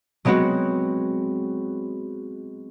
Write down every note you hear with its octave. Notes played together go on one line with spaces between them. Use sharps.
F#3 G#3 B3 C4 F#4